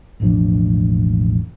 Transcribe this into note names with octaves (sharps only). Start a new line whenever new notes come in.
E1 A1 F3 D4